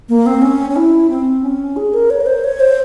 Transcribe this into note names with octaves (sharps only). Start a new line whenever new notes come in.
A#3
C4
C#4
C#4
E4
C4
C#4
G#4
A#4
C#5
A#4
C5
C#5
C5